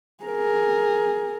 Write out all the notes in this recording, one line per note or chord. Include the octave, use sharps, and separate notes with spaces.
G#4 A#4